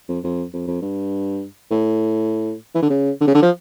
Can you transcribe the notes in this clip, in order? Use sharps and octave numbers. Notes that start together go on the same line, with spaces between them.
F2
F2
F2
F2
G2
A2
E3
D3
C#3
D3
C#3
D3
F3